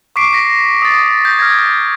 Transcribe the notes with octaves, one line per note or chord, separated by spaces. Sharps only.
C#6 D6 B6 C7 D7
A#6 B6
D#6 A6
G6 A#6
F6 G#6